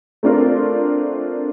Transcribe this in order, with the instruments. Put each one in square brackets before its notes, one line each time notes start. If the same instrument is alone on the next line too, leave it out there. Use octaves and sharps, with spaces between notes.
[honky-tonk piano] A3 C4 D4 F4 A#4